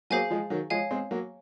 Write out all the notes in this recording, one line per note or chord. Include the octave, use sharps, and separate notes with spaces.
F#3 A#3 G#4 C5 F5 G#5
F3 G#3
D#3 F#3
F3 G#3 C#5 F5 G#5
G#3 C4
F#3 A#3